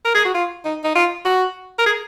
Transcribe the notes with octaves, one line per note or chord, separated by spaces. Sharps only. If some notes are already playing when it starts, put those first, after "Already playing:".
A#4
G#4
F#4
F4
D#4
D#4
F4
F#4
A#4
G#4